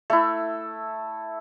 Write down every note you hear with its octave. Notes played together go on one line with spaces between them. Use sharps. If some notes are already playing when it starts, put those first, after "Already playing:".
A3 E4